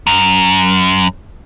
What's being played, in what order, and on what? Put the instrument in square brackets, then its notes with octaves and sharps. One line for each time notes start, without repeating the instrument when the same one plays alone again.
[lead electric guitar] F#2